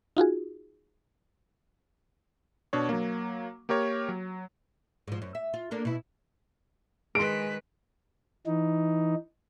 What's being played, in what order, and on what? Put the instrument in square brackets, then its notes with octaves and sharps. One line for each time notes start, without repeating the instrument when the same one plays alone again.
[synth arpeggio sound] D#4 F4 F#4 G#4
[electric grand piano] B2 D4 C#5
F#3 A#3
A#3 G4 A#4 C#5
F#3
[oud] G#2 F3
F#2
E5
F4
A#3 D4 A4
B2 E4
[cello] D#3 B4 [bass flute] G#3 [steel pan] G#4 C6 [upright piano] D7
[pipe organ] E3 D#4